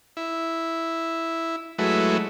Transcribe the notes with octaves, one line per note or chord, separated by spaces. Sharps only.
E4
F#3 G#3 A3 E4 B4